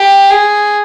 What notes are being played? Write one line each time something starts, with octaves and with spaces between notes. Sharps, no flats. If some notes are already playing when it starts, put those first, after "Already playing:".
Already playing: G4
G#4